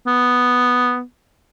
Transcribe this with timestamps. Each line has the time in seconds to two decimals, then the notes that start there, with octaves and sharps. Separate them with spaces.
0.07 B3